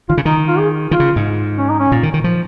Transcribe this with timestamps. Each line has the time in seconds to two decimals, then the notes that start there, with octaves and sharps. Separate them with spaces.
0.09 D#3 F4
0.17 C#3
0.25 D#3 D#4
0.48 F4
0.58 G#4
0.91 D#3 F4
1.00 C#3
1.16 G#2
1.58 C#4
1.69 D#4
1.79 C#4
1.92 A#2
2.03 D#3
2.14 D#3
2.24 F3